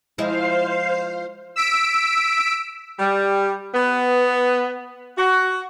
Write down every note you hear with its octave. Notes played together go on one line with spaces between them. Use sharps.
F3 G#3 E4 C5 F5 C7
E6 B6 D7
G3
B3
F#4